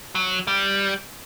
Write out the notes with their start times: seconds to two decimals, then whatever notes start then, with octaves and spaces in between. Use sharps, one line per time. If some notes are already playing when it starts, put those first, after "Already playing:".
0.15 F#3
0.47 G3